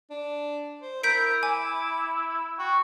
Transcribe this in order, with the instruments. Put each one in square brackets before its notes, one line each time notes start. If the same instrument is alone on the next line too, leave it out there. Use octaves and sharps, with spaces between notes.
[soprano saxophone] D4
C5
[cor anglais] E4 [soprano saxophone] A#4 [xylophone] G6 B6 D7
[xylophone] G#5 [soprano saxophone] D6
[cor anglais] F#4 [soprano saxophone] G5